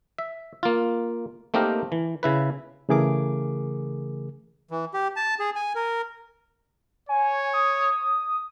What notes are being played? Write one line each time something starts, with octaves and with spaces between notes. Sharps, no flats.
E5
A#3 F4
A3 A#3 C4 D#4 G4 A#4
E3
C#3 E4 B4
C#3 E3 A3 G#4 A#4 D6
E3
G4
A5
G#4
G#5
A#4
C#5 G#5
D#6